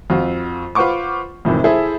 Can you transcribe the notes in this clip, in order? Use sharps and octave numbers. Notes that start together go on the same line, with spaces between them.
F2 F4 F#4
F4 B4 C5 F#5 C#6 D6
F2 A2 C3 D#3 E3
E4 G#4 A4 C5 E5